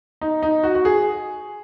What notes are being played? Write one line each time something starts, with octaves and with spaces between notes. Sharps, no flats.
D#4
D#4
F#4
F#4
G#4